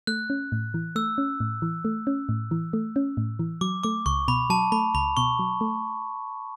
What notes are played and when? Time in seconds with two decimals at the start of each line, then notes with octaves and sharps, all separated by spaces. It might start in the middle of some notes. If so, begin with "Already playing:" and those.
0.07 A3 F#6
0.30 C#4
0.52 A2
0.74 E3
0.96 A3 E6
1.18 C#4
1.40 A2
1.62 E3
1.85 A3
2.07 C#4
2.29 A2
2.51 E3
2.73 A3
2.96 C#4
3.17 A2
3.39 E3
3.61 F#3 D6
3.84 A3 D6
4.06 C#2 C#6
4.28 B2 B5
4.50 F#3 A5
4.72 A3 B5
4.95 C#2 B5
5.17 B2 C#6
5.39 F#3
5.61 A3